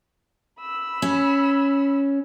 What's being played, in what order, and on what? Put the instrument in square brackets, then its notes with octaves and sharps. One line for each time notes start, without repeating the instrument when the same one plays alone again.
[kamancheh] B5 E6
[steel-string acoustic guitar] C#4